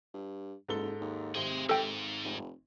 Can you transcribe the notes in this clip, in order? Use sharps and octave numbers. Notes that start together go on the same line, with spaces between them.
G2
F#1 G#2 A4 G7
D#2
G#1 C3 G#4 C6
G#2 A4 G5
F1